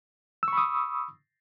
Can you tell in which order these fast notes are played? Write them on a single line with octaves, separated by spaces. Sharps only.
E6 C#6 B5 D#6